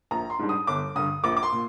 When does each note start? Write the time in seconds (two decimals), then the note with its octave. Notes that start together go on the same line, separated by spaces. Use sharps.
0.11 A#1 A#5
0.30 C6
0.39 G#2 G3 D4
0.49 D#6
0.67 G1 D6
0.95 G2 D3 D#6
1.24 A#1 D6
1.37 D6
1.43 C6
1.52 A#2